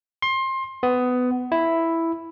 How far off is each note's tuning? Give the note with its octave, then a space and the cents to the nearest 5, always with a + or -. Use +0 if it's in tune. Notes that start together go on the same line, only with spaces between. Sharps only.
C6 +25
B3 +20
E4 +0